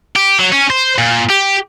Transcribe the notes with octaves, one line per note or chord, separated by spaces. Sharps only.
G4
F#3
C#4
C5
A#2
G4